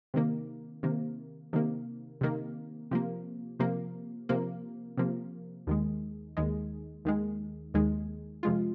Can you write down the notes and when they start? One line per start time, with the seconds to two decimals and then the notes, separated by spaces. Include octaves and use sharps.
0.14 C3 D#3 A#3
0.83 C3 D#3 A#3
1.53 C3 D#3 A#3
2.21 C3 D#3 A#3
2.91 C3 F3 A#3
3.59 C3 F3 A#3
4.29 C3 F3 A#3
4.97 C3 F3 A#3
5.67 D#2 D#3 G#3
6.37 D#2 D#3 G#3
7.05 D#2 D#3 G#3
7.74 D#2 D#3 G#3
8.43 F2 C3 G#3 F4